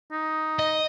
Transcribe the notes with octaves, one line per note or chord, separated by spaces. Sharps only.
D#4
D#5